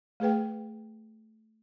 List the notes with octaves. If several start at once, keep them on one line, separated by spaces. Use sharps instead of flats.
A3 G#4 B4 G5